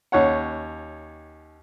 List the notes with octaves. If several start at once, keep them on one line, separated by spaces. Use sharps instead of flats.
D#2 C#4 C#5 F#5